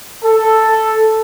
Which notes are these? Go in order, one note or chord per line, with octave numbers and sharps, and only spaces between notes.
A4